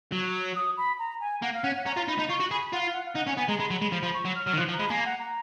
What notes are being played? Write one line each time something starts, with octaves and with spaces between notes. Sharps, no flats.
F#3
D#6
B5
A#5
G#5
A#3 F#5
F5
C#4 F#5
F#5
C#4 A#5
F4
D#4 B5
D#4
F4 C#6
F#4
G#4 B5
F4 F#5
F5
F#5
F5
D#4 F#5
C#4 G#5
B3 G#5
G#3 A#5
G#3 B5
F#3
G#3 B5
F3
F3 B5
C#6
F#3
F6
F#3 F6
D#3
F3 F#6
F3
A#5
G#3 B5
A#3 G#5
F#5
A#5